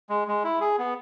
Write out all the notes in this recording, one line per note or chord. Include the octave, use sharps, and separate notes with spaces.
G#3
G#3
E4
G#4
B3